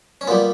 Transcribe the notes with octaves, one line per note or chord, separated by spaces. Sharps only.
C#4
A#2 G3 B3